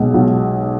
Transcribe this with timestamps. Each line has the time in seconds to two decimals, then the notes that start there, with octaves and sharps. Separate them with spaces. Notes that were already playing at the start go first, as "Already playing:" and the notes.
Already playing: B1 B2 G#3
0.14 B1